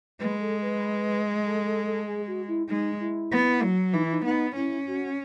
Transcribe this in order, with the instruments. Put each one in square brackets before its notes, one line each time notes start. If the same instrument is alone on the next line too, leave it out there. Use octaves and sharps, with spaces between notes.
[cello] G#3 [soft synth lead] B4
[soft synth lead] A4
B4
A4
A4
A4
G#4
F#4
E4
[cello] G#3 [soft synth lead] D#4
[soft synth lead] E4
[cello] B3
F#3
[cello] E3 [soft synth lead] D#4
[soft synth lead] E4
D#4
[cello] B3 [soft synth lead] D#4
[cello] C#4 [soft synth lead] E4
[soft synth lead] F#4